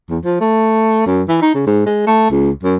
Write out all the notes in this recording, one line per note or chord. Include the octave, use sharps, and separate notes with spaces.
E2
F3
A3
F#2
E3
D#4
C#3
G#2
G#3
A3
C#2
F#2